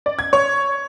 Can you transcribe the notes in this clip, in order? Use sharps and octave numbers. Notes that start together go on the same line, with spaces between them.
D5
G#6
C#5